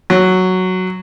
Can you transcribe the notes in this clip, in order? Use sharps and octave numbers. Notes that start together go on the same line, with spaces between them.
F#3